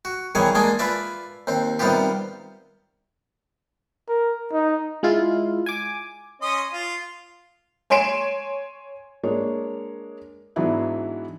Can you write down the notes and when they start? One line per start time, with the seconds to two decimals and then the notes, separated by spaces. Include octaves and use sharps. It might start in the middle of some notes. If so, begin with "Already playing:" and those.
0.05 F#4
0.35 E2 D#3 E3 G3 G#4 C#5
0.55 G#3 A#3 D4 D#5 G#5
0.79 F4 B4 D5 E5
1.47 D#2 C4
1.79 C3 D#3 G3 B3 F4 G4
4.08 A#4
4.53 D#4
5.03 G#3 E4 F4
5.66 G#5 D6
6.42 C#4 D#5 C6
6.73 F4
7.90 C#5 G#5 C6 D7 E7
9.23 G#3 A#3 D4 C#5
10.56 G#2 E3 F#3 B3 D4 E4